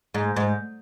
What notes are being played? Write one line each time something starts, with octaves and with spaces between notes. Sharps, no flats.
G#2
G#2